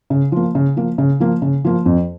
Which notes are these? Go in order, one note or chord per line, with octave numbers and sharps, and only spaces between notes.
C#3
F3 A#3
C#3
F3 A#3
C#3
F3 A#3
C#3
F3 A#3
F2